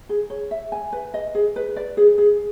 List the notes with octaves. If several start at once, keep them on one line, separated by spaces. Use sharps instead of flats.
G#4
C#5
E5
G#5
B4
D#5
G#4
B4
D5
G#4
G#4